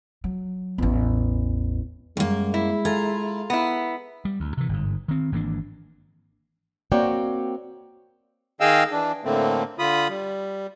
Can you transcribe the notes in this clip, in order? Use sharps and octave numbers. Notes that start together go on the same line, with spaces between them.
F#3
A1 E2
F#2 G3 G#3 A#3
E4
F4 G#4 A4 A#5
B3 E4
G3
D2
C3 E3
G1 G#2
D#3 C4
G#1 E3 A#3 D4
A#3 C4 F#4 C#5 D5 G5
D#3 G#4 D#5 F5 G5 E6
E3 D4
A2 D3 A3 A#3 C4
D3 F4 B5 D#6
G3